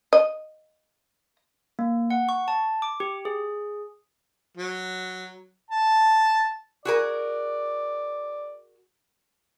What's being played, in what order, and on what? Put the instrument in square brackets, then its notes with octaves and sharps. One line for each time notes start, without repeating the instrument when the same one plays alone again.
[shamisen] D#5
[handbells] A#3
F#5
C#6
A5
D6
G4
G#4
[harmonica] F#3
A5
[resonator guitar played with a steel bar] F#4 G#4 A#4 [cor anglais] D5